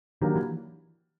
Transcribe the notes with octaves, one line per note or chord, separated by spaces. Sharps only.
D#3 F#3 A#3 D4 G4
E3